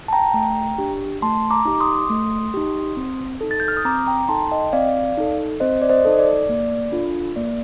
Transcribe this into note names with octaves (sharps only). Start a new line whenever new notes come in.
A5
G5 A#5
A3
D4 G4
A3 A5 C6
A#5 D6
D#4 G4
D6
C6 D#6
A3
D#4 G4
C4
D#4 A4
A6
G6
F6
D#6
C4 A#5 D6
G5 A#5
D#4 A4 A5 C6
D#5 G5
C4 D5 F5
D#4 A4
C4 C5 D#5
D5
C5 D#5
D#4 A4
D5
A#3
D4 F4 A4
A#3 D5